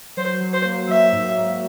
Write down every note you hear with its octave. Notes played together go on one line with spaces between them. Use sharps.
F#3 C5
F#3
C5
A#3
F#3 E5
G#2
A#3